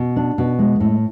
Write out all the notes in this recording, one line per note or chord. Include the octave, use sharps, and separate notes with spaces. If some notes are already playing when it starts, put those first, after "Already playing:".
Already playing: B2
D4
B2
G#3
A2